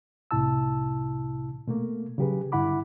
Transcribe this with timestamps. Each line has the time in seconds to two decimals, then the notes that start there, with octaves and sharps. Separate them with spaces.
0.31 C2 A2 C3 E4 A5 E6
1.67 B2 A3 A#3
2.18 C#3 F#3 G4 G#4 B4
2.52 G2 D3 E4 F#5 B5 D6